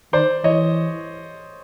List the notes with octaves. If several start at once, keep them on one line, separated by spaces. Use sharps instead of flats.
D#3 C5 D5
E3 C#5 D#5